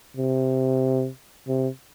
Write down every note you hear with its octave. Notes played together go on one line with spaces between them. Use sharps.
C3
C3